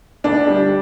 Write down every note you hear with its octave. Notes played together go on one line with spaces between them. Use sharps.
D2 D4
G3